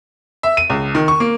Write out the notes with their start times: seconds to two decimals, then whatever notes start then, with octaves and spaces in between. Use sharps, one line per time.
0.43 E5
0.57 D#7
0.70 C#2
0.95 D#3
1.08 C#6
1.20 A#3